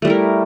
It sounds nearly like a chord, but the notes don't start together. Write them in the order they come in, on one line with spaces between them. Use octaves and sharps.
A3 G3 E4 A#4